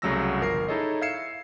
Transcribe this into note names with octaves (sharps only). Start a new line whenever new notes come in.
C2 C#3 F#3 A3 E6 A#6
G1 F3 A#4 C7
D#4 E4 G#4 A4 C#5 D#5
E5 F5 G#6 C7 C#7 E7